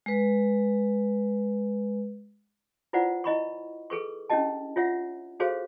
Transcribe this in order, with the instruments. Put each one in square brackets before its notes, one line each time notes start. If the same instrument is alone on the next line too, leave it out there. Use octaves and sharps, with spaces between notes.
[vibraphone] G#3 B4
[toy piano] E4 F4 B4 C5 D5 F#5
E4 D#5 B5 C#6
G#4 A4 B4 C#6
C#4 D4 E4 G4 D#5 A5
F4 C#5 E5 F#5
F#4 G#4 A4 C5 C#5 F5